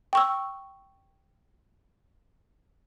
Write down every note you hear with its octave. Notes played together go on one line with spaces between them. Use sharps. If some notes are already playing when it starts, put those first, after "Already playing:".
G5 C#6 E6